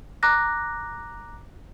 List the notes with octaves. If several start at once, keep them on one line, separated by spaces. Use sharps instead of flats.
A#5 D6 F#6 A#6